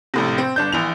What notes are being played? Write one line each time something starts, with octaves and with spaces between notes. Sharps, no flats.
A#1 A2 C3
C4
G1 D4 G6
A#1 E3 F7